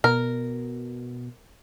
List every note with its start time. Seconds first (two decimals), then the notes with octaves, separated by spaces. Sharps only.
0.04 B2 A#4